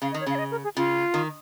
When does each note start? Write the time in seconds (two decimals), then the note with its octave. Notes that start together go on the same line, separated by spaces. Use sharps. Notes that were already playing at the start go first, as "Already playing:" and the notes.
0.02 C#3 F5
0.12 D#5
0.14 D#3
0.21 C#5
0.26 C#3 F5
0.35 C#5
0.39 D#5
0.51 A#4
0.64 G#4
0.77 C#3 F4
1.14 D#3